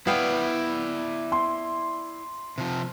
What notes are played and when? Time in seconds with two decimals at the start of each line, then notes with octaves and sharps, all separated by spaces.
0.07 B3 E4 D5 F5 G5
1.32 C6
2.58 C3 F3